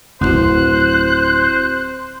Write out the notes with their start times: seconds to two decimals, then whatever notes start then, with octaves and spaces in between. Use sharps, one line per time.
0.21 D1 G#1 D2 C4 E4 F#4 C5 F#6